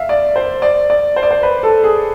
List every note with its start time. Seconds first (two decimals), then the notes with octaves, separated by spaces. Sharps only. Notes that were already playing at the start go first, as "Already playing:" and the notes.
Already playing: E5 F5
0.09 D5
0.36 C5
0.62 D5
0.90 D5
1.16 C5
1.23 D5
1.31 C5
1.43 B4
1.63 A4
1.83 G#4